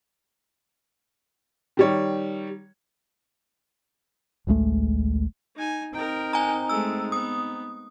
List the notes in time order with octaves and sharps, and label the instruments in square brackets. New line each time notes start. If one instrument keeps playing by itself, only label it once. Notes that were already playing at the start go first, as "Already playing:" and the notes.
[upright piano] D#3 G3 C#5
[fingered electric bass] A1 D2 G#3 A3
[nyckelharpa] D#4 G#5
[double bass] C4 D#4 [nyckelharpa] A#4 G5
[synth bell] G#5 A#5
[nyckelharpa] G#3 A3 [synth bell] E6
[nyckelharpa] B3 [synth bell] D#6